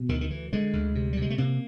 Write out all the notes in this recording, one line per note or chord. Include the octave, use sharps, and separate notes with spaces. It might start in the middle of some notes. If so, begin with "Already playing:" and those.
Already playing: B2
D2 D#3
D#3
D2 E3
D3 G#3
D2
C3
G3
C3 G#3
A3
C3 A#3